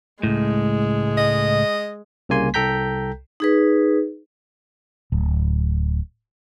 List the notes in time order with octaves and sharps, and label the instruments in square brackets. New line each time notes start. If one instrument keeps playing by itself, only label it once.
[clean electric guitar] C#2 A2 [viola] G#3
[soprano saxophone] D#5
[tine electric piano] C2 C#3 G3 A#3 G#5 C6
C2 A4 G5 A#5 G6 B6
[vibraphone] D#4 G#4 B4
[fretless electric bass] D1